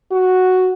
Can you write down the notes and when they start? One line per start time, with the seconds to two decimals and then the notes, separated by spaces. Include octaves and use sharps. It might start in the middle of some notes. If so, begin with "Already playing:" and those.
0.12 F#4